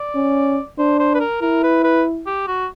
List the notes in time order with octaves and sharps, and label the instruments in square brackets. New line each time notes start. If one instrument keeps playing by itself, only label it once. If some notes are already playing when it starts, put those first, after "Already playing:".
Already playing: [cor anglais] D5
[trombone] C#4
[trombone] D4 [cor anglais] C5
[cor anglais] C5
B4
A#4
[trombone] E4 [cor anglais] A#4
[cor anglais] B4
B4
G4
F#4